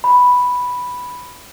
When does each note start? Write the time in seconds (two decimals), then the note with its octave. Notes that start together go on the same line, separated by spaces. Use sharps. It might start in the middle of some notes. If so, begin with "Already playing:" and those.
0.04 B5